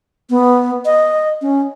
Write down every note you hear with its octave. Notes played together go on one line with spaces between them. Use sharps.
B3
D#5
C#4